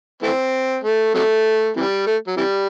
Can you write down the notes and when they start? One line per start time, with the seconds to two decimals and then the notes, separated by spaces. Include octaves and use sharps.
0.22 E3 A3 C4
0.84 A3
1.15 C3 F#3 A3
1.76 C3 E3 G3
2.07 A3
2.27 F#3
2.37 C3 E3 G3